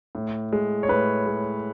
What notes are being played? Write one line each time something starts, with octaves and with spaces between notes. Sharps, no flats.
A2
G#3
C#5
A2 B4
G#3